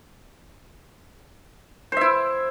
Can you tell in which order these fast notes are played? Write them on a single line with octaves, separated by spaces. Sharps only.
C5 E5 E4